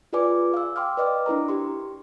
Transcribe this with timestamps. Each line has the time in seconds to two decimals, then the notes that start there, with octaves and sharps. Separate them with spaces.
0.13 F4 G#4 B4 D5 G#5 D6
0.54 F5 E6
0.76 G5 C6 D6 F6
0.97 B4 D5 D#5 D6 F6
1.26 D4 E4 A#4 A#5
1.48 G4 C6